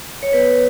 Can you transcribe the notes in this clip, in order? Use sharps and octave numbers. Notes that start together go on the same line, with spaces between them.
C#5
B3 B4